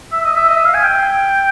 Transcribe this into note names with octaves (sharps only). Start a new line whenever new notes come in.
E5
D#5
E5
D#5
E5
F5
G#5
G5